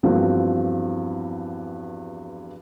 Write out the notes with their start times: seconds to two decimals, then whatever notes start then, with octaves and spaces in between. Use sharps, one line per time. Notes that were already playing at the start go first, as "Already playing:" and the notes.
0.03 E2 G2 F3 A#3 C4 F#4